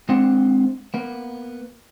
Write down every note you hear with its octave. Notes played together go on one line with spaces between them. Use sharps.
G#3 C4 D4 C5 F#5
A#3 B3